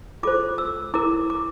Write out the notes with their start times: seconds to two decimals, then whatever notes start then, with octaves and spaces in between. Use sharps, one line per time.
0.23 F4 A4 C5 D6
0.58 E6
0.94 E4 A#4 D6
1.30 D6